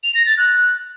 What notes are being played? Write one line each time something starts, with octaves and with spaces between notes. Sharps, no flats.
F7
A#6
A6
F#6